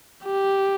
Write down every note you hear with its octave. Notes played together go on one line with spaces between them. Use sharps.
G4